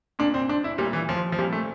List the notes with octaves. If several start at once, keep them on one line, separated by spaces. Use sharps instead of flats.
A#2 D4
C4
D4
E4
A#2 G3
E3
F3
F3
A#2 G3
A3